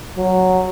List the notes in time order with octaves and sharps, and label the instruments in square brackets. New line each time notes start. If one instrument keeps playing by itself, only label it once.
[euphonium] F#3